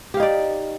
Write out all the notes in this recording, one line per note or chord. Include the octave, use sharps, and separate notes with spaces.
D#4 G4 D5 F5